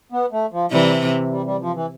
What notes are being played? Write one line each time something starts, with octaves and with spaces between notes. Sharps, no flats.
B3
A3
F3
C3 E3 G3
G3
G3
F3
E3